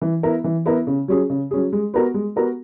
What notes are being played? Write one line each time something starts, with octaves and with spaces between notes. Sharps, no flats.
E3
B3 E4 A#4
E3
B3 E4 A#4
C#3
F#3 C#4 G#4
C#3
F#3 C#4 G#4
G#3
B3 F#4 A#4
G#3
B3 F#4 A#4